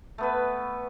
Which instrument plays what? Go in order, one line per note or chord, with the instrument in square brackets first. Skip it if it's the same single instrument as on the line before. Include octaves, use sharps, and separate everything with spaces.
[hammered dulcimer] A3 B3 B4